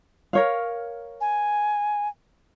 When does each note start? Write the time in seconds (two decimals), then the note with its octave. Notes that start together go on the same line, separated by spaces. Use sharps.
0.33 A#4 C#5 F5
1.21 G#5